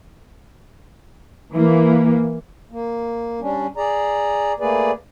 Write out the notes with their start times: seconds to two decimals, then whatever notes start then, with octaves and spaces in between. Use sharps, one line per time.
1.53 E3 A#3
2.71 A#3
3.40 G3 C#4 D4
3.77 G#4 D5 A#5
4.60 A3 A#3 G#4 B4 D5